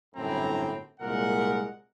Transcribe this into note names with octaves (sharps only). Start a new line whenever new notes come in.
G1 F#2 A2 C4 E4 A#5
C2 A#2 G#3 A#4 F#5